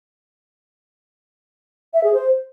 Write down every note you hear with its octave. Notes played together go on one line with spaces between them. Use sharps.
E5
G#4
C5